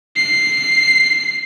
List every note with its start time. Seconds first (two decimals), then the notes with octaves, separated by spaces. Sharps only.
0.16 C7